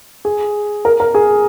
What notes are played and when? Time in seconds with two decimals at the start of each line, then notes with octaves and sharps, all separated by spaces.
0.25 G#4
0.85 A#4
1.00 A#4
1.15 G#4